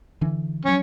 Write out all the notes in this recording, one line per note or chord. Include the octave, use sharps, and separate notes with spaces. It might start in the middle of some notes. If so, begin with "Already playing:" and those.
D3 E3 D4
F3 F#3 C#4